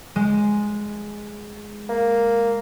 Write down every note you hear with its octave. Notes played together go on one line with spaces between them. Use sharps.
G#3
A#3